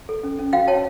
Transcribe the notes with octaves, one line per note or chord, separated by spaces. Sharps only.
A4
C#4
C#4
F#4 F5 G5
C#5 G5 A5